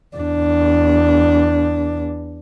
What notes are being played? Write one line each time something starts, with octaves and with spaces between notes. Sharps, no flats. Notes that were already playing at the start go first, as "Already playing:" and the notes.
E2 D4